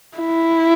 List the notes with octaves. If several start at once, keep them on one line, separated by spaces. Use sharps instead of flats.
E4